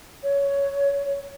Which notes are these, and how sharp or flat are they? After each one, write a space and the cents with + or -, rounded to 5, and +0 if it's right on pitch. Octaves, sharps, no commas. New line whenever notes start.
C#5 +10